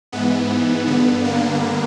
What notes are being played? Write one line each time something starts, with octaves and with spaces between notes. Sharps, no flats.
G#2 E3 B3
G2 D3 B3
A#3